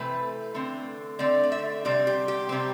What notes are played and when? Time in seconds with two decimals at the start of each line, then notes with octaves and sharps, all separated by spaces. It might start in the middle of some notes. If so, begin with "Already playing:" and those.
Already playing: C3 E3 A3 C4 B4
0.54 D3 A3 C4
1.19 D3 A3 C4 D5
1.43 D5
1.52 E5
1.85 C3 G3 C4 D5
2.07 G4
2.28 G4
2.49 C3 G3 C4